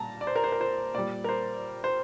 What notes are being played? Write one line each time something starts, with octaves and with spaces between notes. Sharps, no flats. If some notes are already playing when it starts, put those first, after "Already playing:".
Already playing: A#2 G3 A5 A#5
D5
C5
A#4
C5
A#4
C5
A#2 G3 D5
A#4
C5
C5